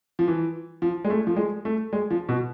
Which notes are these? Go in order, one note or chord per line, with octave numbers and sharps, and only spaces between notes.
F3
E3
F3
G#3
A3
F3
G#3
A3
G#3
F3
B2